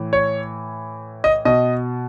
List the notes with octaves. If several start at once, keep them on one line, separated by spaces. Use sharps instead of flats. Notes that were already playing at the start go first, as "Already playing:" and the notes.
Already playing: A2 E3
C#5
D#5
B2 D#5